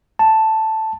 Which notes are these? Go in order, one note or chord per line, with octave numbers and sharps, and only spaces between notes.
A5